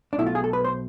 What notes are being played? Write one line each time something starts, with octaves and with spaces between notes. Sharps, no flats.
D4
B1 B2 A3 E4
F4
G#4
A4
B4
C5